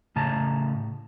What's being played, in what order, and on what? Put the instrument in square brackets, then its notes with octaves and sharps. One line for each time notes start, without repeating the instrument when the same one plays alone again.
[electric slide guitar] A2 C#3 A5 A#5